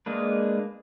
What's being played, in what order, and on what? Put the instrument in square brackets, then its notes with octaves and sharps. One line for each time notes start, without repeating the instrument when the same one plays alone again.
[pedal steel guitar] G#3 A#3 D4 B4